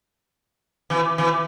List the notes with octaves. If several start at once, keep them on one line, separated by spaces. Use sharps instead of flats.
E3
E3